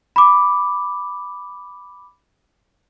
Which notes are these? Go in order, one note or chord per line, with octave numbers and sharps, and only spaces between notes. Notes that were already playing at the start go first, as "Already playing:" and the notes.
B5 D6